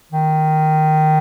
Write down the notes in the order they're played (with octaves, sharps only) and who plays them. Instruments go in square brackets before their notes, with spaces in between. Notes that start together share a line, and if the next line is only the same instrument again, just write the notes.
[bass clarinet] D#3